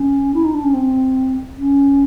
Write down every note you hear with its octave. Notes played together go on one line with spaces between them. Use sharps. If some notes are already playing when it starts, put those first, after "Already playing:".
Already playing: C#4
E4
D#4
D4
C#4
C4
C#4